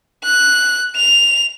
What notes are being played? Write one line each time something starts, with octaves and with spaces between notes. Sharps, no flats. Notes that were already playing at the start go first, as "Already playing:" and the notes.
F#6
F7